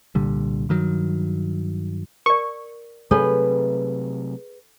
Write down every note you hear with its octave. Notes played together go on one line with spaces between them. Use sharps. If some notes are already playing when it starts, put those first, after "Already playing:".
C2 A#2 D3 G3
G2 D#3 F#3
A#4 D5 C#6
C3 F#3 A3 G#4 A4 B4 C#5